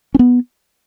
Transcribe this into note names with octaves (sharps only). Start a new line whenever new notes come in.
C#4
B3